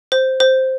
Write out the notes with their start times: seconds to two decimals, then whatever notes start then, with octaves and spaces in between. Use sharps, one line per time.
0.12 C5
0.40 C5